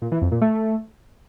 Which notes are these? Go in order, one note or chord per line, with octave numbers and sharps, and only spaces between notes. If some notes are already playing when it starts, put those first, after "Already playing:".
A#2
E3
F2
A#2
A3